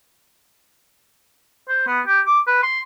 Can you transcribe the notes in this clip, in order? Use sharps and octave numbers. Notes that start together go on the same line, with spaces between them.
C5
B3
G4
D6
B4
C6